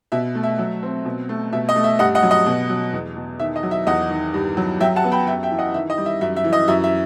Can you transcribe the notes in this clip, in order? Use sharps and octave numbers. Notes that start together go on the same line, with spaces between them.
B2 E5
A3
E5
F#3
C4
B2
A3
B2 E5
D#5
A3
E5
G2 D#5 F#5
D#5 F#5
F#3
D#5 F#5
B2
F#3
E2
B2
D#3 E5
D#5
F#3
E5
E2 D#5 F#5
D#3
G2
F#3
F#3 E5 G5
F#5 A5
B3
G5 B5
F#2 E5 G5
E5 G5
E3
D#5 F#5
D#3 E5
D#5
G3
E5
F#2 E5
E5
E3
D#5
F#2 E5
E5